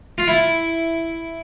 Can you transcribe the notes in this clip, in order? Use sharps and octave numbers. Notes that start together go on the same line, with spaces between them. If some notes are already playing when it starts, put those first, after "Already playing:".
F4
E4